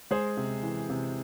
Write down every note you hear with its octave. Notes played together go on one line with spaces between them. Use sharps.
G#3 G#4 C5
C3
E3
C3